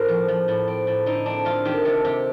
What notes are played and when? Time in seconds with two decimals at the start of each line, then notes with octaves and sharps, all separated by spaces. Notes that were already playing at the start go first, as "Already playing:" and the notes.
Already playing: A2 C4 A#4 C5
0.08 F3
0.28 F3
0.48 A2
0.68 C4
0.87 A2
1.06 D3 D#4
1.26 C4 D4
1.45 D3 F4
1.65 D#3 G4
1.85 C3 A4
2.04 C3 G4